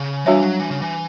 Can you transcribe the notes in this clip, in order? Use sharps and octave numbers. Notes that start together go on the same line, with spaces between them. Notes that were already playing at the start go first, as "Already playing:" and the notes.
Already playing: C#3
E3 G3 D4 F#4 C#5 E5
F#3
E3
C#3
E3